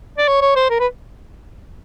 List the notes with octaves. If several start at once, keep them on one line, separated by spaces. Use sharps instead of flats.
D5
C#5
C#5
C5
A#4
B4